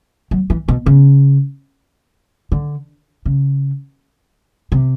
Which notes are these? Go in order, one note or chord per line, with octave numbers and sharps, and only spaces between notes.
F#3
E3
B2
C#3
D3
C#3
C3